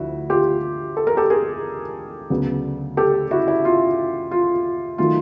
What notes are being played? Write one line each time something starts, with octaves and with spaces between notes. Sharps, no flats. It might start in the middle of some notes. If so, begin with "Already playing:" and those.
Already playing: D2 D3 F3 E4 F#4
F4 G4
A4
A#4
G4 A4
G#4 A#4
D2 C#3 F#3 B3
G4 A4
E4 F#4
E4
F4
F4
D#3 F#3 A3 F4